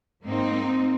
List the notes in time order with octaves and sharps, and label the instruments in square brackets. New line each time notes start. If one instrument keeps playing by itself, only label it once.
[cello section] G#2 A#3 C4 D#4